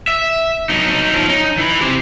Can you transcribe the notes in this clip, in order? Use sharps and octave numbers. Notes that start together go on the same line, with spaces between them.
E5
F#3 D#4
F3 C#4
D#4
E3 B5
G4 C5